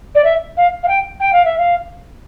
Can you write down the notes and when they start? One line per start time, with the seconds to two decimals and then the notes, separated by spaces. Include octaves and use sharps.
0.15 D5
0.24 E5
0.57 F5
0.83 F5
0.88 G5
1.20 G5
1.32 F5
1.45 E5
1.58 F5